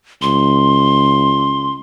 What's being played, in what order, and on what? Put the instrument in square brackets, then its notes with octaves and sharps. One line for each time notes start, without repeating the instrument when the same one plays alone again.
[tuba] C#2 [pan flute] C6